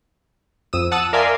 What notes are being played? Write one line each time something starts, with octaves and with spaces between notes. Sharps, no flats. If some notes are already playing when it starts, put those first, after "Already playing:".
F2 D#6 E6
F#5 A5 D#6 E6
A#4 D5 E5 F5 G#5 C6